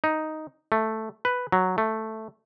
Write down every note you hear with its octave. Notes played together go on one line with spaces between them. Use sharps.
D#4
A3
B4
F#3
A3